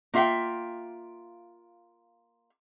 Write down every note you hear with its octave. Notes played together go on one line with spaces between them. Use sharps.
A#3 F4 E5 F#5 G5